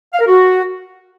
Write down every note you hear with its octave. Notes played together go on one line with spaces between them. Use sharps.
F5
A#4
F#4